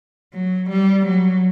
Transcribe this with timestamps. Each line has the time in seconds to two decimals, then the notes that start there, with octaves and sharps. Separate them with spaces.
0.33 F#3
0.69 G3
1.05 F#3